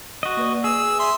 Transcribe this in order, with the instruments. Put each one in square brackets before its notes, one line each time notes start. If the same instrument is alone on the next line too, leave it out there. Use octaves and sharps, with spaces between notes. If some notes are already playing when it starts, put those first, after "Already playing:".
[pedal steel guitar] F#4 D#5
[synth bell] A#3 B4 D5
[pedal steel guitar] G#4 [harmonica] E6
[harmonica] E5 C6